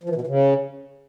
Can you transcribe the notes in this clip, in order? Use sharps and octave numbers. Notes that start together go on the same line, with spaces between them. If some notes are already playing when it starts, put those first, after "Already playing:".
F3
E3
B2
E3
C#3